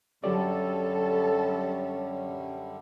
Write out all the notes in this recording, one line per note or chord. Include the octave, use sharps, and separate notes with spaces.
F#2 D3 F#3 G3 C#4 G4 A4 D5